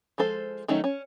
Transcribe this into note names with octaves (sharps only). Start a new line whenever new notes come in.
F3 G#3 A4 C5
D#3 F#3 A3 C#4 D#4
C#4